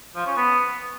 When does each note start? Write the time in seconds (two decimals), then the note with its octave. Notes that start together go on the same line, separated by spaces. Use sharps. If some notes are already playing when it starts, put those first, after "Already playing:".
0.16 F3
0.26 C#4
0.37 B3